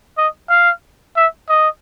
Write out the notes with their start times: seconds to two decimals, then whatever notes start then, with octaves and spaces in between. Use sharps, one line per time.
0.18 D#5
0.50 F5
1.16 E5
1.49 D#5